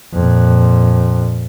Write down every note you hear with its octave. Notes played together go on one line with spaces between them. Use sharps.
F2 A#2